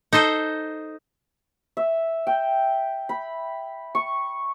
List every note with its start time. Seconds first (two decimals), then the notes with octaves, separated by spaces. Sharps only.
0.13 D#4 A4 C5 D#5
1.77 E5
2.27 G5
3.09 B5
3.95 C#6